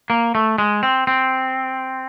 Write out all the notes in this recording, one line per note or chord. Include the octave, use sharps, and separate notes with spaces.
A#3
A3
G#3
C4
C4